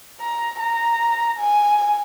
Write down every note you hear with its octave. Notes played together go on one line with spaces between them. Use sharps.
A#5
A#5
G#5